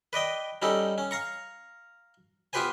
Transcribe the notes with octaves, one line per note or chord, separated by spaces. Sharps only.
B4 D5 D#5 G5
G3 C#4 D#4 G4 A4
C#4
F5 A#5 C#6
B3 F4 G4 B4 C5 G#5